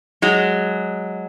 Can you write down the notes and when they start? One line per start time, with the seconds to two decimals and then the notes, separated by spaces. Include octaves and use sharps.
0.22 F#3 G#3